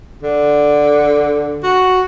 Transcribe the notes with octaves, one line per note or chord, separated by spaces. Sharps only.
D3
F#4